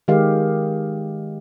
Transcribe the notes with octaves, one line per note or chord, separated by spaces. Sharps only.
D#3 G#3 G4 F5